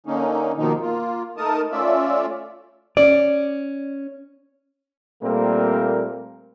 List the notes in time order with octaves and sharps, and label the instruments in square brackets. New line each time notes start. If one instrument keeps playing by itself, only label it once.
[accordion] D3 A#3 C#4 D#4
B2 D#3 F3 A#3 D#4
A#3 F4
A3 D#4 A#4 A5 D#6
A3 C#4 F4 D5 E5
[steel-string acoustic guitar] C#4 [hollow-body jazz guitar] D5
[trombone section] A#2 G3 A3 A#3 C4 A#4